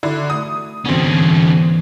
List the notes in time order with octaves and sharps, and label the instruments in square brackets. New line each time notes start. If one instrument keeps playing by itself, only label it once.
[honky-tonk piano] D3 E4 [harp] F#4 B5
[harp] A3 G6 [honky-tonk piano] D#6
[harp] G#2 E3 G3 [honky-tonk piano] B2 C4 [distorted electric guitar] D3 C#4